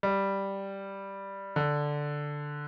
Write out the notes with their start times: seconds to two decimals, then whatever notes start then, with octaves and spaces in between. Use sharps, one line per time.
0.03 G3
1.56 D3